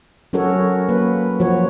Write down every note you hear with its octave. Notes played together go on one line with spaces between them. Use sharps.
F#3 C#4 F#4 A4 A#4 C#5
A#3 B4
F3 F#4 C#5